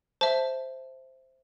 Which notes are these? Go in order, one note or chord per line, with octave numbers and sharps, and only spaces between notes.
C5 E5 A5